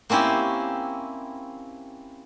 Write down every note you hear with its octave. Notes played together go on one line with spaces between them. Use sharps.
A#3 C4 C#4 E4 G4